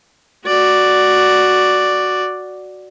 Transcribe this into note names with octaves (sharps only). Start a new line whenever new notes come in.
F#4 D5